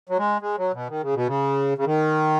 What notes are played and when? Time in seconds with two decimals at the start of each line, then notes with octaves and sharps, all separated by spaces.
0.09 F#3
0.18 G#3
0.42 G#3
0.58 F#3
0.73 B2
0.89 D#3
1.02 C#3
1.15 B2
1.27 C#3
1.78 C#3
1.85 D#3